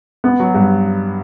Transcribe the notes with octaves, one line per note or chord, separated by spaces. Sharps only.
B3
F#3
G2